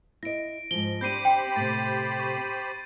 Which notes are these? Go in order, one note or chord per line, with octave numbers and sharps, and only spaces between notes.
E4 D#5 A#6 D7
G#2 F3 G7
C4 D4 G4 C5 B5 G6 C7 D#7
G5
A2 C3 A6
C#6